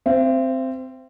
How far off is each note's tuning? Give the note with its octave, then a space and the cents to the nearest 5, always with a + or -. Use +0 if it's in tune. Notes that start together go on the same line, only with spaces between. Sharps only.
C4 -5 E5 +45